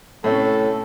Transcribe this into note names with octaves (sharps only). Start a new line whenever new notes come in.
A2 C3 C#4 A4